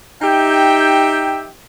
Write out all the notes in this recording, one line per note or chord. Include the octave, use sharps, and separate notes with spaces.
D#4 G4 E5 G5